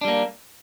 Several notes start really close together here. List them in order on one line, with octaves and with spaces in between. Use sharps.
D4 G3 A#3